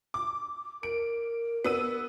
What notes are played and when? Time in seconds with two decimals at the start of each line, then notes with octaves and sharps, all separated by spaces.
0.14 D6
0.83 A#4 D7
1.65 B3 E6 D#7